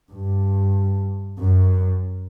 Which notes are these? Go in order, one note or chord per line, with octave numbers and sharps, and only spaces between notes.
G2
F#2